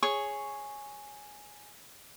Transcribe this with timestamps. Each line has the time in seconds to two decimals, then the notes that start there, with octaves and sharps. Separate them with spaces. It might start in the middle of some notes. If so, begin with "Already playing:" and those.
0.03 G#4 C#5 C#6